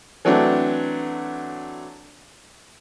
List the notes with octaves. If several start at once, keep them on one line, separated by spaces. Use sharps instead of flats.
E3 F#3 A3 C4 D4